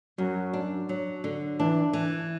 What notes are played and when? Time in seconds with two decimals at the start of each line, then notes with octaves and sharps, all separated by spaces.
0.18 F#2 F#3
0.53 D4
0.89 F#3
1.24 D3
1.59 E3 D4
1.93 E3